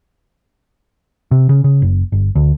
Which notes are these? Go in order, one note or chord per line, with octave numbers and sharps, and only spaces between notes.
C3
C#3
C#3
F#1
G1
D2